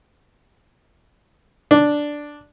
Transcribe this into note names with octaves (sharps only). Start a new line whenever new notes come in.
D4